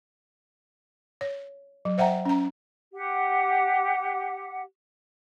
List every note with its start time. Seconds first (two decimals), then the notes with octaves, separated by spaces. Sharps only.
1.21 C#5
1.85 F#3
1.98 C5 E5 F#5 G5 A#5
2.25 C#4 A#5
2.94 G4 F#5